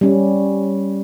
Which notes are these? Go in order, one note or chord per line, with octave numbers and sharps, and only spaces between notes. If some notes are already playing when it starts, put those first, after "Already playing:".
G3 C#4